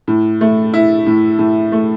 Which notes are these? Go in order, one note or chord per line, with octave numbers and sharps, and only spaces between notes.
A2
A3
E4
A2
A2
A3